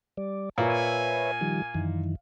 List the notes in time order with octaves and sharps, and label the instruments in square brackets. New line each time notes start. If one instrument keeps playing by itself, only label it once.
[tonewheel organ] G3 D5
[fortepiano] A#2 [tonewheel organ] B4 C#5 E5 [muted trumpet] G#5
[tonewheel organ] D#3 F3 G3
F#2 D#3 E3